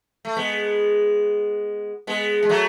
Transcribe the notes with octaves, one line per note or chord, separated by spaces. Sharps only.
A3
G#3 B3
G#3 B3
G#3
F#3 A3